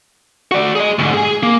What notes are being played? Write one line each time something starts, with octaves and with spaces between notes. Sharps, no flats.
F#4 D5
G#4 D#5
D2 G#2
G#4 G#5
A#3